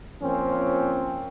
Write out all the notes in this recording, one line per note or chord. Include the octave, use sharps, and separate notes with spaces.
F3 A#3 C4 C#4